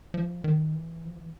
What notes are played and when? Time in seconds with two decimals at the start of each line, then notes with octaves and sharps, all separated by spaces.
0.14 F3
0.44 D#3
0.74 E3
1.05 F3
1.15 E3